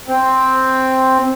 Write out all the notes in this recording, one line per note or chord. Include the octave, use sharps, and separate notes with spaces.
C4